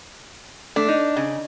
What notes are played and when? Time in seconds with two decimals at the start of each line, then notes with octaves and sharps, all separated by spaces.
0.76 A3 D4
0.89 D#4
1.17 C#3